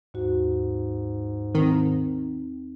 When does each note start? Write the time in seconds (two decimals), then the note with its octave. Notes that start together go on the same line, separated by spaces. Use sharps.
0.14 D#2 G#2 F#4
1.55 D#3 C4 D#4